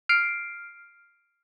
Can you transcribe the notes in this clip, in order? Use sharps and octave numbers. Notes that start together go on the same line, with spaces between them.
F6 C7 D7